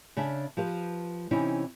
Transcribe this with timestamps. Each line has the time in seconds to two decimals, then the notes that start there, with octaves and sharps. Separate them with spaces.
0.17 C#3 D4 E5
0.57 F3 G4 B4
1.31 C3 E3 C#4 D#4 E4